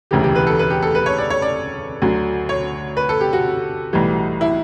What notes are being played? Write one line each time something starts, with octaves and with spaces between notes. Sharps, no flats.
E1 D2 C#3 E3 G4
G4
B4
A4
B4
G4
A4
B4
C#5
D5
C#5
D5
D2 D3 F#3
C#5
B4
A4
G4
F#4
B1 A2 E3 G3
E4